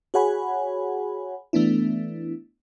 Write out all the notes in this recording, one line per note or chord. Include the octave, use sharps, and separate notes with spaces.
F#4 G#4 C#5 F#5 G#5 B5
E3 A3 B3 D4 E4